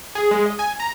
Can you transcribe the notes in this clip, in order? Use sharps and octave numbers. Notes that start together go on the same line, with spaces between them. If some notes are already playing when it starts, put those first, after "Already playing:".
G#4
G#3
D#5
G#5
A#5